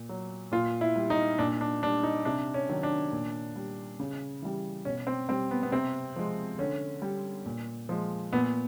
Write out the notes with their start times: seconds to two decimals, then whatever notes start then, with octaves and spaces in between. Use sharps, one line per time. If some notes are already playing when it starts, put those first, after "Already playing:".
Already playing: A#2
0.09 F#3
0.52 A#2 F4
0.81 E4
0.96 G3
1.10 D#4
1.38 A#2 D4
1.61 D4
1.82 G3 D4
2.03 D#4
2.25 C3 D4
2.54 C#4
2.69 D#3 F#3
2.83 D4
3.12 A#2
3.56 G3
4.00 C#3
4.42 E3 G3
4.85 B2 C#4
5.07 C4
5.29 G3 C4
5.51 B3
5.63 B3
5.72 C3 C4
6.16 F3 G#3
6.59 D3 C#4
7.02 G3
7.46 A#2
7.89 F3 G#3
8.33 A#2 B3